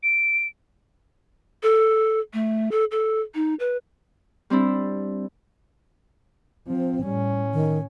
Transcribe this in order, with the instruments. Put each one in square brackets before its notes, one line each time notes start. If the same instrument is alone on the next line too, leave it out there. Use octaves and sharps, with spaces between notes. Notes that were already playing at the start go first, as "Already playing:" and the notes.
[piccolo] D7
[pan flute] A4
A3
A4
A4
D#4
B4
[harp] G3 C4 D4 E4
[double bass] F3 [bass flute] C4
[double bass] A2 C#4 [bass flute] G3
[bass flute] D#3